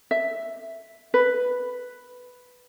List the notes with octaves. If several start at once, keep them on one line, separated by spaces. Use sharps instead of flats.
E5
B4